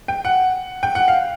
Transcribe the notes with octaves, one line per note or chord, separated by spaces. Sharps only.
G5
F#5
G5
F#5
F5